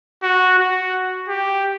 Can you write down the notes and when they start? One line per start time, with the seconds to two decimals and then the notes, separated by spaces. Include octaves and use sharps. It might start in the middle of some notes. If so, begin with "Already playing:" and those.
0.23 F#4
0.59 F#4
1.29 G4